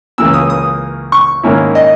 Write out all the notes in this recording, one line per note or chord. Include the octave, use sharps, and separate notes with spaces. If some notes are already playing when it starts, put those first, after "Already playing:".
C#2 C#3 E3 A#3 E6
D#6
D#6
C#6
G#2 D#3 A#3 C#4 E4
D#5